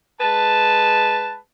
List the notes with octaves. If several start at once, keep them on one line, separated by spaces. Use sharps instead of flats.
G#3 B4 A5